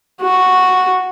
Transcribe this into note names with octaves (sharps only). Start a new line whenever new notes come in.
F#4